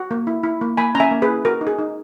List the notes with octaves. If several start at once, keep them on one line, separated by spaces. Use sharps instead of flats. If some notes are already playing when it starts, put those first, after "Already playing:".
Already playing: F#4
A#3
E4
E4
A#3
A#3 G#5 B5
C#4 A#5
E5 G#5
A#3
G#4 B4
E4
F#4 A#4
D#4
G#4
D#4